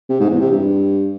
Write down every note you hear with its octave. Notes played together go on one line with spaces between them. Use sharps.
C3
G#2
E2
C3
G2